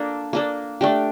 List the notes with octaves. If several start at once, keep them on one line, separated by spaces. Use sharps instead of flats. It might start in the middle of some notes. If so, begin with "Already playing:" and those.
Already playing: A#3 D4 A4
A#3 D4 A4
A3 D4 G4